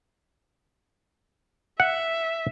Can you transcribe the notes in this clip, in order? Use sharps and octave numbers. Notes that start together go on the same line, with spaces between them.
E5 F#5